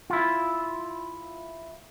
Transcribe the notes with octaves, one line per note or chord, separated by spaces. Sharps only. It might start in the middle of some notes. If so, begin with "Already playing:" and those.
E4 F4